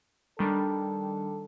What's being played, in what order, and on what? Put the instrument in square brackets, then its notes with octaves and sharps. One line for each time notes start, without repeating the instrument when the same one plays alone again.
[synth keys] D#3 G3 D4 [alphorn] A4